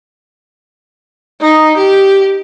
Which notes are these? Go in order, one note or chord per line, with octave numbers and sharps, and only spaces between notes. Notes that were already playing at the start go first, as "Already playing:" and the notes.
D#4
G4